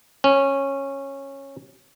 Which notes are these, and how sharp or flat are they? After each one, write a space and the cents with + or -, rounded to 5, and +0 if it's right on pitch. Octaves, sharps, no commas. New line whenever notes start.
C#4 -15